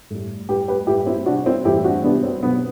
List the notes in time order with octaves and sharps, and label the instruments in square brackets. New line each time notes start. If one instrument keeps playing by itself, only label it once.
[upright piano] A2 G3
A2 G3 G4 B4
G4 B4
A2 G3 E4 G4
C4 E4
C3 G3 D4 F#4
C4 E4
A2 E3 G3 E4 G4
D4 F#4
C3 G3 B3 D4
C4
B2 F#3 B3